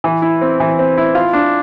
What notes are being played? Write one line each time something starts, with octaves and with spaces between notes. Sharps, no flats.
E3
E4
C4
E3
C4
E4
F4
D4